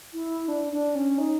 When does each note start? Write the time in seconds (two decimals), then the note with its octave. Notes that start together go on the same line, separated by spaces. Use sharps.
0.14 E4
0.48 D4
0.72 D4
0.95 C#4
1.18 D#4